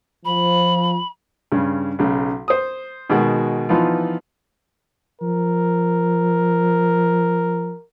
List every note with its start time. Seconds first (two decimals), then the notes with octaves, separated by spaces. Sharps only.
0.25 F3 B5
1.52 G2 C#3
1.99 B1 C#3
2.48 C5 D#6
3.10 B2 D#3 G#3 F#4
3.69 E3 F3 B3 D#4 F4
5.22 F3 A#4